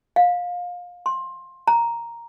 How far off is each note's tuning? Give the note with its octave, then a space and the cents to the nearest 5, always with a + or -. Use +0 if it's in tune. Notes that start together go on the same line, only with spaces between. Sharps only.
F5 +25
C6 +20
A#5 +0